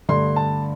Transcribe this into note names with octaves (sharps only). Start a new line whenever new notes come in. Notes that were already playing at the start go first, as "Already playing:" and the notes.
G2 D3 A3 C6
A5